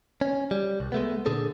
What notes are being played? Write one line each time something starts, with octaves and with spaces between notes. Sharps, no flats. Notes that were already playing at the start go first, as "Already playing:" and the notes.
C#4
G3
C2
G#3 A3 B3
A#2 D3 G#4 A4